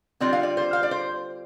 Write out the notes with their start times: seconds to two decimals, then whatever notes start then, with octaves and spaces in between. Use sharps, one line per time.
0.20 D3 G3 C4 F4 D5
0.33 F5
0.43 D5
0.57 C5
0.73 F5
0.83 D5
0.91 C5